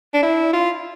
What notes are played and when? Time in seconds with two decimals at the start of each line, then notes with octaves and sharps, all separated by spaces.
0.14 D4
0.22 E4
0.53 F4